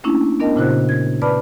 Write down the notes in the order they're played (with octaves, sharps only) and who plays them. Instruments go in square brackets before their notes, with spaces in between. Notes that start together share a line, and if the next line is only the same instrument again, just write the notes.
[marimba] A3 A#3 C#4 D4 E4
B3 D4 A#4 D#5 G5 A5
A#2 C#3 E4 F#4 C5 F#6
G#6
B4 D5 A5 B5 D6 F6